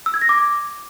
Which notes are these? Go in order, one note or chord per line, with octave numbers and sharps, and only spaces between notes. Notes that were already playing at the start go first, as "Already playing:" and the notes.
E6
G#6
A#6
D6